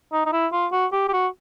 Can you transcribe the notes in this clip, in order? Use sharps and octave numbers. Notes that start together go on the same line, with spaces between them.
D#4
D#4
E4
F4
F#4
G4
G4
F#4